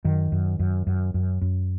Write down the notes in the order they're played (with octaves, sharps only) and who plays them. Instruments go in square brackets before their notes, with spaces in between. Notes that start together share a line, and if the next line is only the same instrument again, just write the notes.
[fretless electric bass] F#2 D#3
F#2
F#2
F#2
F#2
F#2